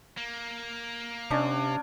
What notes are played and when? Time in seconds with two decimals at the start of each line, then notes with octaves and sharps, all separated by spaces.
0.17 A#3
1.31 C3 C#4 D4